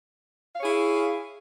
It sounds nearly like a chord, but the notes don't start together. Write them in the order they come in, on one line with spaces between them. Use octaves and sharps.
F5 C#5 G#4 E4